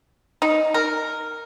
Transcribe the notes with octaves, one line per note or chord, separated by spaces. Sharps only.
D#4
A#4